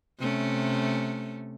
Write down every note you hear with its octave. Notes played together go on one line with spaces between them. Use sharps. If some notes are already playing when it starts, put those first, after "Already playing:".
C3 A3 C#4